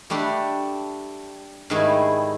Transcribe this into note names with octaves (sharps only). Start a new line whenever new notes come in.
G3 A3 D4 G4 F#5
G#2 D#3 G3 A3 E4 G#4